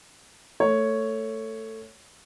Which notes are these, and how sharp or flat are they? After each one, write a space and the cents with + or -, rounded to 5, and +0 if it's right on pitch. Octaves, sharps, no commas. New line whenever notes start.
A3 +15 C#5 +0